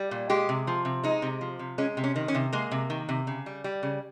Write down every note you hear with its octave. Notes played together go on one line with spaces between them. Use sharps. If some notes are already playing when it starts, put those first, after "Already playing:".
Already playing: G3
A#2
G#3 G4
C3
F3
C3
G#3 D#4
C3
F3
C3
G#3 C#4
C3
C#4
D#3
C#4
C3
G#3 A#3
C3
D#3
C3
C#3
G3
G3
C#3